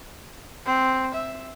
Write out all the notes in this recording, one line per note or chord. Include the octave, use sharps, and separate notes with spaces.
C4
E5